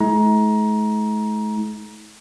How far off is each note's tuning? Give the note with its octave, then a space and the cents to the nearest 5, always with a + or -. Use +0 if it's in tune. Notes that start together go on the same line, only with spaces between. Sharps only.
A3 -45 E4 -45 A#5 +20